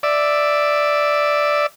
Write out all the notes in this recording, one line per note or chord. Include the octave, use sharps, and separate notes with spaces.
D5 E5